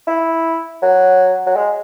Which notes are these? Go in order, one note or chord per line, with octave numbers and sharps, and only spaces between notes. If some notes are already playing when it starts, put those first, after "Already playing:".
E4
F#3
F#3
G#3